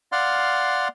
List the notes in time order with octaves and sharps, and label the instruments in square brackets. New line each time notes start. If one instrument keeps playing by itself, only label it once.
[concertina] D5 F5 F#5 C6 F6